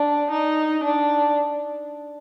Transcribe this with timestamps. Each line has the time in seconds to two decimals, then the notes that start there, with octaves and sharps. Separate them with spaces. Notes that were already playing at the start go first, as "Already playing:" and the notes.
Already playing: D4
0.31 D#4
0.84 D4